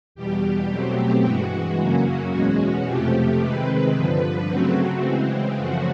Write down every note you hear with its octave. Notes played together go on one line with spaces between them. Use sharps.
E2 B2 G3 G4
B2 F#3 A3 C4 G4
G2 E3 G#3 F#4
F#2 C#3 F#3 A#3 C#4 F#4
E2 B2 G#3 C#4 F#4
F2 C3 F3 A3 G4
C3 D#3 G#3 C4 B4
G2 D3 F3 B4
C#3 F#3 A3 C4 F#4
C#3 E3 G#3 C4
F#2 C#3 F3 A3 F#4